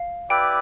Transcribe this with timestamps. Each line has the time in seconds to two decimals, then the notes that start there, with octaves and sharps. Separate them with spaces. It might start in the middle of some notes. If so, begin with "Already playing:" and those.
Already playing: F5
0.30 E4 G4 B4 D5 G5